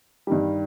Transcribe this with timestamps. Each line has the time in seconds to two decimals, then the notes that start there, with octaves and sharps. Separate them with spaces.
0.27 G2 D#3 G3